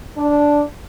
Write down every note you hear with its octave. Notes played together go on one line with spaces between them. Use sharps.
D4